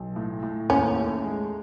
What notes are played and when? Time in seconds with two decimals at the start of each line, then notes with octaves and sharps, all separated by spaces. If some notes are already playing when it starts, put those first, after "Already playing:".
Already playing: B1
0.16 A2
0.43 A2
0.70 D#2 C#4
0.96 A3
1.24 G#3